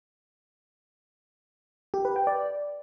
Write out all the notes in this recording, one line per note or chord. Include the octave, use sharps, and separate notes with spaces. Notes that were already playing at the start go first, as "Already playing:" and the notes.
G4
B4
G5
D5